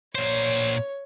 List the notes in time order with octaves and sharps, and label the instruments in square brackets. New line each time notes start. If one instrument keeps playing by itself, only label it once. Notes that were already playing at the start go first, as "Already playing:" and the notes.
[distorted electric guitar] A#2 C5 [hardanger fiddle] C#5